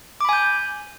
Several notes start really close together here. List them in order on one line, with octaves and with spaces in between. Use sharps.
D6 B5 G#5 G6